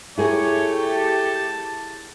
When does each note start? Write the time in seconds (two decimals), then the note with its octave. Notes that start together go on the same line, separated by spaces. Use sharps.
0.17 A3 E4 G4 G#4 A#4 C#5
0.83 A5